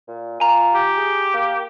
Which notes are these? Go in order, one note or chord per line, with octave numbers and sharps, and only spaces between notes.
A#2
F4 G#5 A#5
G4
G#4
A#3